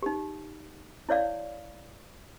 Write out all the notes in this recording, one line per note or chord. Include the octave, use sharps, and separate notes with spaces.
D#4 G4
E4 C#5 D5 F5